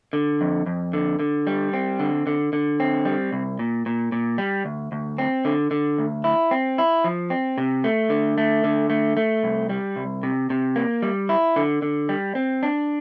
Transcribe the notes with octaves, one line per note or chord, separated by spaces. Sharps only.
D3
F2
F2
D3
D3
G3
C4
D3
D3
D3
C4
G3
C2
A#2
A#2
A#2
G3
D2
D2
C4
D3
D3
D2
E4
C4
E4
F3
C4
C3
A3
D3
A3
D3
A3
A3
C2
G3
C2
C3
C3
A#3
G3
E4
D3
D3
G3
C4
D4